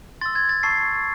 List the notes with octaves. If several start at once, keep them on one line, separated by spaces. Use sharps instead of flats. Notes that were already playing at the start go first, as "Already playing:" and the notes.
C6 E6 A6
G#6
A6
A5 C#6 E6 C7